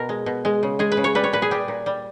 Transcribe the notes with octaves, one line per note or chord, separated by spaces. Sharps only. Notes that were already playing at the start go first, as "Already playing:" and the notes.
Already playing: B2 A#4
G#3
B2
G#3
C#3
G#3 G#4
B4
C#3
C#5
G3 B4
C#5
A#2 B4
G#4
G3 G4
A#2
G3